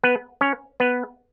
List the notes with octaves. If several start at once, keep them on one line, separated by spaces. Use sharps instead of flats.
B3 B4
C#4 C#5
B3 B4